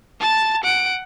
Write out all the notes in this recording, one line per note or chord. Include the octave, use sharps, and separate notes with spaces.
A5 A6
F#5 D7